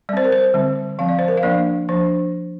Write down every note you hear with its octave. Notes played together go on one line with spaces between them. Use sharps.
G3 C4 C5 D5
A#4
C5
D3 G3 C4
F3 C4 F5
D5
C5
A#4
F5
F3 A#3 D4 D5
F3 D4 C5